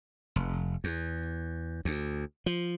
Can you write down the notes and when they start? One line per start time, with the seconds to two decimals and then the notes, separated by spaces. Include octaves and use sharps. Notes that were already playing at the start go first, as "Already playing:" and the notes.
0.36 F1
0.84 E2
1.85 D2
2.46 F3